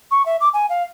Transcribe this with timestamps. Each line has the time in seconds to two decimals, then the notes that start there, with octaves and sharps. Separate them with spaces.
0.11 C#6
0.26 E5
0.41 D6
0.54 G#5
0.69 F5